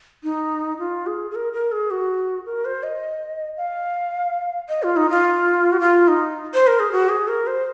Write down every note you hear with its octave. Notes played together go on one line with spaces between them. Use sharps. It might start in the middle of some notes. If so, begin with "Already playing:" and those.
D#4
F4
G#4
G#4
A#4
A#4
G#4
F#4
A#4
C5
D#5
F5
D#5
F4
D#4
F4
F#4
F4
D#4
C5
A#4
G#4
F#4
G#4
A#4
C5